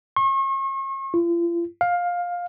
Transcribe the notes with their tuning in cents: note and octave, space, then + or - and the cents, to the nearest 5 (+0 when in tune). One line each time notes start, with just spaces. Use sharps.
C#6 -40
F4 -40
F5 +15